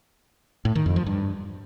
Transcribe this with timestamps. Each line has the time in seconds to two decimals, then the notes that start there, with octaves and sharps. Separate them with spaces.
0.65 A2
0.75 D#3
0.86 F2
0.96 F3
1.07 G2